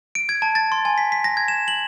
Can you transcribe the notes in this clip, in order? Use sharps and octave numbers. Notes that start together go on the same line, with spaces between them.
D7
G#6
A5
A6
C6
G#5
B6
B6
A#6
G#6
E7
F#7